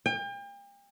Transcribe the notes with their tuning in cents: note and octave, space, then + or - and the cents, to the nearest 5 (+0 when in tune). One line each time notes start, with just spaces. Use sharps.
G5 +40